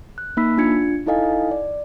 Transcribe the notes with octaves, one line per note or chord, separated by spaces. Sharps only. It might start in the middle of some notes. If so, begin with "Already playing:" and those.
F#6
A#3 D#4 B5 E6 B6
D4 F4 G#6 C#7
D#4 E4 A4 D#5 F5 G#5
D5